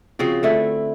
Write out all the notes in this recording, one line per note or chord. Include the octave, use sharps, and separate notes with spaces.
C#3 F3 C4 F#4
D3 A3 E4